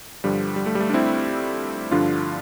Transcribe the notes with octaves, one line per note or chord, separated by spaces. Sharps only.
G2 D3 F3 G3
G3
A3
G3
A3
D4
C4 E4
G2 D3 F3 D4 F4